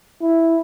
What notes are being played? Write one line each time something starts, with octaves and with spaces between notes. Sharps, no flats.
E4